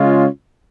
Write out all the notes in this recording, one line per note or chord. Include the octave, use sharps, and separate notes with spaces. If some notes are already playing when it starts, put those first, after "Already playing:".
Already playing: C#3 G#3 C#4 F4